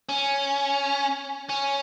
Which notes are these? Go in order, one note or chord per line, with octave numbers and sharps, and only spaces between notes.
C#4
C#4